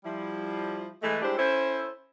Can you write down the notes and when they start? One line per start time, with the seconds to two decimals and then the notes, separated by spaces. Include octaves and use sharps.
0.04 F3 G3 E4
1.03 E3 G#3 A3
1.22 G3 G#3 D4 E4 G4 C5
1.38 C#4 E4 A4 C5